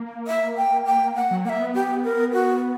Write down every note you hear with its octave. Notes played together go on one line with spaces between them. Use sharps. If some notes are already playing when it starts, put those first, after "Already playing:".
Already playing: A#3
E5
G5
G5
F#5
F#3
A#3 E5 F#5
B3
G4
A#4
F#4